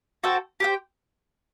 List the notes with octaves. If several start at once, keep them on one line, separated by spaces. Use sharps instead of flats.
F#4 A4 C5 G5
G4 C5 G5